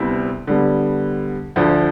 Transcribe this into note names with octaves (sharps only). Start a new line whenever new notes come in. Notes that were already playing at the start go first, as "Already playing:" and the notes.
Already playing: D2 C3 G3 B3 E4
D3 G3 B3
D2 D3 F3